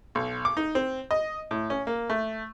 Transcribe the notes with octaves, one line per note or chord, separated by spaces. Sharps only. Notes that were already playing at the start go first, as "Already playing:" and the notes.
B1
D6
D#4
C4
D#5
A2
C#4
A#3
A3